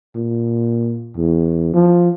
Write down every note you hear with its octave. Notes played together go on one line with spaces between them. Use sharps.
A#2
E2
F3